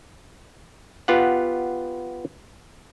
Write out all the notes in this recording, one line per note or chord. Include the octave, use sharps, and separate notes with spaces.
B3 F4 G4 F#5